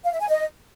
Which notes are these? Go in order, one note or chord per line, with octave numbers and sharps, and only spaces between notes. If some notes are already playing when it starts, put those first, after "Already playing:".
F5
E5
G#5
D#5